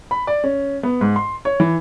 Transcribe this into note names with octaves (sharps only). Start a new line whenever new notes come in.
B5
D5
C#4
B3
G#2
C6
C#5
E3